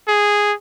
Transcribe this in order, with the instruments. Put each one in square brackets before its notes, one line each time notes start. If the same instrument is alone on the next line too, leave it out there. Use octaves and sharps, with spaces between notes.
[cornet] G#4